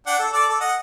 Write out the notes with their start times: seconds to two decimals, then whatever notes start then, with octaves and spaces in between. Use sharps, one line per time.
0.07 D4 F#5 G5
0.19 A4
0.33 A4 D5 D6
0.49 A4
0.61 D#5 F#5